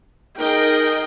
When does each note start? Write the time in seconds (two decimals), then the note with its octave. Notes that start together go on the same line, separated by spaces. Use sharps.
0.38 D#4 G#4 A#4 D#5 G5